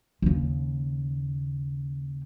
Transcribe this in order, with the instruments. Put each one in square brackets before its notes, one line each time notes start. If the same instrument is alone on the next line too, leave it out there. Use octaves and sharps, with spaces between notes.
[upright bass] D#2 C#3